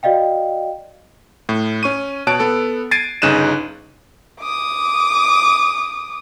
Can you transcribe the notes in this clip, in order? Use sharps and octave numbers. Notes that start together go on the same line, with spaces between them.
F#4 D5 D#5 F5 G5
A2
C#4 C#6 D#7
B2 C#5 A5 F#6 D7
B3 A4
G#6 A6 C7 D7 D#7
G1 C#3 D#4 F#6 D#7 E7
D6 D#6